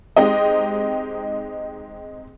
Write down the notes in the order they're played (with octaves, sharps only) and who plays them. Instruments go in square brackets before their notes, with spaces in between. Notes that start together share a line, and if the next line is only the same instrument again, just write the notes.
[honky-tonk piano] G#3 C4 D#4 G4 D#5